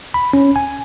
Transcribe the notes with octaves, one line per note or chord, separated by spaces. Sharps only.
B5
C#4
G#5